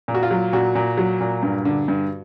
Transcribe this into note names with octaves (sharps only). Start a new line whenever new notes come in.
A#2
F#4
F4
F#3
A#2 F#4
A#2
F#3
A#2
G2
D3
G2